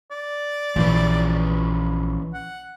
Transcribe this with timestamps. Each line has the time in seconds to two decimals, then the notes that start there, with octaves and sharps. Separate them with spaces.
0.11 D5
0.76 A#1 E3 F3 C#4 B4
2.34 F#5